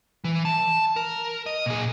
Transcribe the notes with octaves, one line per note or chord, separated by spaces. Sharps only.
E3
A5
A#4
D#5
A#2 G#4